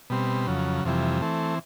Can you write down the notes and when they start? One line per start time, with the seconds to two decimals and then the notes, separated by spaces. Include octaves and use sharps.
0.10 B2 G3 C4
0.47 F2 C#3 F#3
0.85 F2 C3 E3 G3
1.21 E3 A3 C4